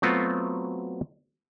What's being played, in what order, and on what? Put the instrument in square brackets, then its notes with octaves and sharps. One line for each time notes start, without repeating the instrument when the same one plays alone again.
[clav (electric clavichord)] F#3 A3 B3 C4 F4 F#4